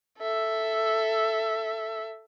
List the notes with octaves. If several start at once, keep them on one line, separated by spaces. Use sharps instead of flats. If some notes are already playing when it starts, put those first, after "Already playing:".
A4 E5